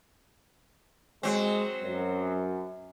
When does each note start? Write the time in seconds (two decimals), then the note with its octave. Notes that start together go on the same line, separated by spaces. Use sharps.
1.23 F#3 G#3 C4
1.83 F#2